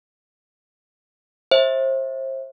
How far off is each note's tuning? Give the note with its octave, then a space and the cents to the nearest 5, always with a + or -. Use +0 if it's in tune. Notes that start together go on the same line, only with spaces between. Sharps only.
C5 +30 E5 -10